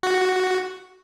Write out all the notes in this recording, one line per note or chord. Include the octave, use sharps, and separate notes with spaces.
F#4